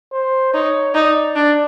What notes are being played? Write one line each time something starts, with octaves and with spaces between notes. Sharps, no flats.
C5
D#4 C#5
D#4 D5
D4